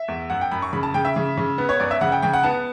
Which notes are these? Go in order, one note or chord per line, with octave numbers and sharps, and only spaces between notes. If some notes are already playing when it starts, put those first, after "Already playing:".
Already playing: E5
E2
F#2 F#5
G5
F#2 B5
C#6
C#3 B5
A5
C#3 G5
E5
C#3
C#3
B3
C#5
F#2 D5
E5
C#3 F#5
G5
C#3 G5
F#5
B3 A5